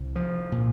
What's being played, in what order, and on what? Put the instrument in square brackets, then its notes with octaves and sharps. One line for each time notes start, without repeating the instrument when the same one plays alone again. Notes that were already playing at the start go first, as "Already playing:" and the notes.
Already playing: [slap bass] C2
F3
A#2